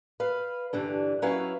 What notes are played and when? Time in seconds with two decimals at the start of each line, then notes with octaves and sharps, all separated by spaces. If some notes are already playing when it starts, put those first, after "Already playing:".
0.20 B4 F5
0.73 G2 D3 E3
1.22 F#3 C#4 E4 B4 F5 F#5